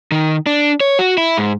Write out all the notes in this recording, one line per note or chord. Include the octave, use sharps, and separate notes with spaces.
D#3
D4
C#5
F#4
E4
G#2